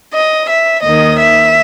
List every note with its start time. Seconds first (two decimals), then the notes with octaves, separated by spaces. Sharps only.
0.13 D#5
0.49 E5
0.83 D#2 D#3 D#5
1.18 E5